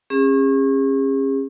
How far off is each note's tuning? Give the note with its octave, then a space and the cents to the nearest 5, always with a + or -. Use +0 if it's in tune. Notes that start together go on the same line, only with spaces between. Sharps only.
C#4 -30 G#4 -40